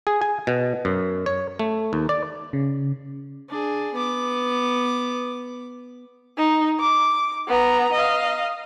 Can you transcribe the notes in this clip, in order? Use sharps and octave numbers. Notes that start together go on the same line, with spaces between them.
G#4
G#5
B2
F#2
C#5
A3
D#2
D5
C#3
D4 G#4
B3 D6
D#4
D6
B3 A#5
D#5 F5